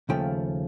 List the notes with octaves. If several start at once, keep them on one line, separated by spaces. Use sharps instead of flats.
D#2 C#3 F3 A3 G5